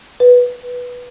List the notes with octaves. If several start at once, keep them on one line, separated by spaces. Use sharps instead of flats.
B4